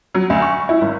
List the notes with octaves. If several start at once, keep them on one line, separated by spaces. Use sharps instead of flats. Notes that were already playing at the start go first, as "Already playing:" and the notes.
F#3
D2
C#6
E4
G#1